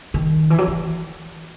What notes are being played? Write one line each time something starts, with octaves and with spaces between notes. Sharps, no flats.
D#3
E3
F#3
E3